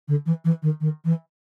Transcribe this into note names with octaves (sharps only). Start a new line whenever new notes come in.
D3
E3
E3
D#3
D#3
E3